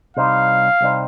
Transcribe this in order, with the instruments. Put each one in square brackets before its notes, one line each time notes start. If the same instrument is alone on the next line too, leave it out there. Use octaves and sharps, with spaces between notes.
[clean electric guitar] C2 C3 G3 D#4 C5 [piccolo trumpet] F5
[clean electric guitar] C2 C3 G3 D#4 C5